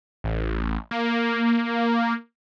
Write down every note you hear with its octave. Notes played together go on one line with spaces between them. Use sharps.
A1
A#3